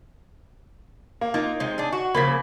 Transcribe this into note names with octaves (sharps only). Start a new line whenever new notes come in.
A#3
A#3 D#4 F4
C3 G#3
D4 G#4
F#4
C#3 F3 A#3 B5 B6